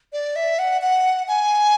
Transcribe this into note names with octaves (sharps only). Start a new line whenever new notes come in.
D5
E5
F#5
F#5
G#5